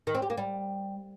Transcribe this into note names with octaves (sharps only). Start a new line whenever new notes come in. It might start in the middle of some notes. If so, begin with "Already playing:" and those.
D#3
C4
G4
A#3
G3